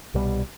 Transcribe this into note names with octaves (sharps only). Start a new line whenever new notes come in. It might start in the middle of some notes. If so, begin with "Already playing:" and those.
C2 B2 G3